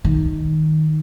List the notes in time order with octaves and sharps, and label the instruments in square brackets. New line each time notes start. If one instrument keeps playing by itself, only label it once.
[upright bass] D#3